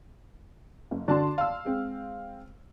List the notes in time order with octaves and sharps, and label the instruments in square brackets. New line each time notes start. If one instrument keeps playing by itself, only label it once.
[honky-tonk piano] F#1
[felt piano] D3 D4 F#4 [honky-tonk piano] D5 A5 C6
[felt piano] F5 E6
[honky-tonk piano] G#3 C4